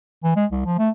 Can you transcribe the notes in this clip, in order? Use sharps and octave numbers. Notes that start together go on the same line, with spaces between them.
E3
G#3
C2
F3
A3